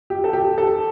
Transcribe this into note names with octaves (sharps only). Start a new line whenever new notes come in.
G4
A4
G4
A4